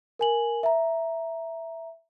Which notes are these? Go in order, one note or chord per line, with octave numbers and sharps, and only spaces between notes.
A#4 G#5 F#7
E5 A#5